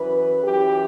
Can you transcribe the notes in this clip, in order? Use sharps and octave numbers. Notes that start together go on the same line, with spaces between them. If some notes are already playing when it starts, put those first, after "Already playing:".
Already playing: F#2 E3 B4
F#2 E3 G4